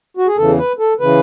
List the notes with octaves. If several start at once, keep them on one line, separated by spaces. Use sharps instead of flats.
F#4
G#4
E2 C#3 E3 A4
B4
A4
C#3 E3 B4